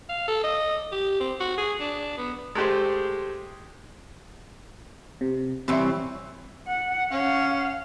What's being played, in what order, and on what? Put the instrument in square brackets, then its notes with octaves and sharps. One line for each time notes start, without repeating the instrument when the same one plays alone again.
[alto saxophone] F5
A4
D#5
G4
C4
F#4
G#4
D4
B3
[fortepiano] G#3 A3 G4 C5
[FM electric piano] C3
[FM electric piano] C3 G3 E4 [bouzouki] E3 C4 C#5
[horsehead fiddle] F#5
[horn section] C#4 [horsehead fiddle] F5 F#5